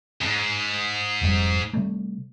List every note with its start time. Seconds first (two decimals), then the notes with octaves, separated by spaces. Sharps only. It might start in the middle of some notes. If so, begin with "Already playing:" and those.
0.21 E2 G#2
1.22 F1 F2 G3
1.74 C3 G3 A3